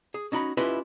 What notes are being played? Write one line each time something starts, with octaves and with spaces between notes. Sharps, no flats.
G#4
C#4 D#4 F#4 B5
C#4 E4 F4 G4 B4 D#5